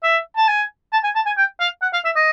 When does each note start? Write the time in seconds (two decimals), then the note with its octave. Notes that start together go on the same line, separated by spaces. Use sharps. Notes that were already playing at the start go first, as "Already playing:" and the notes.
0.03 E5
0.37 A5
0.48 G#5
0.93 A5
1.04 G#5
1.15 A5
1.26 G#5
1.38 G5
1.60 F5
1.82 F#5
1.93 F5
2.05 E5
2.16 D#5